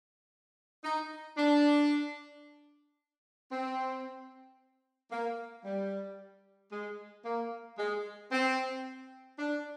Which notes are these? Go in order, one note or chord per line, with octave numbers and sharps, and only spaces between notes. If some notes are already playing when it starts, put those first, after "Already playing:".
D#4
D4
C4
A#3
G3
G#3
A#3
G#3
C4
D4